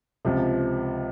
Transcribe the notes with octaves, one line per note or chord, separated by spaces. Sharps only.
C#2 C3 F3